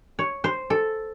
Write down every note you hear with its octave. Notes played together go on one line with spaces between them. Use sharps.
C#5
C5
A4